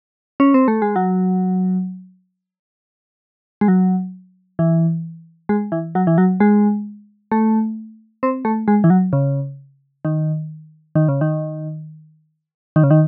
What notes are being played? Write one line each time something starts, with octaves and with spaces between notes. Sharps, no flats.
C#4
C4
A3
G#3
F#3
G#3
F#3
E3
G#3
E3
F#3
E3
F#3
G#3
A3
C4
A3
G#3
E3
F#3
C#3
D#3
D#3
C#3
D#3
D#3
C#3
D#3